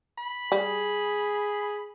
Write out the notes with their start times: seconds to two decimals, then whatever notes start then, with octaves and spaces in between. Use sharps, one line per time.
0.18 B5
0.52 G3 G#4